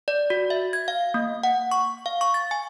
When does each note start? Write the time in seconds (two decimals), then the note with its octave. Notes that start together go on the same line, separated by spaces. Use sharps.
0.08 D5
0.30 F#4
0.50 E5
0.73 G#6
0.88 F5
1.14 A#3
1.43 F#5
1.71 C#6
2.06 F5
2.21 C#6
2.34 A6
2.51 G#5